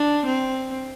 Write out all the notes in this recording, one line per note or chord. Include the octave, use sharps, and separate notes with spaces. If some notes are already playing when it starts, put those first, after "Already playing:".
Already playing: D4
C4